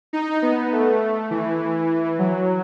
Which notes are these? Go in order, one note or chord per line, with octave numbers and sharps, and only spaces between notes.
D#4
B3
A3
E3
F#3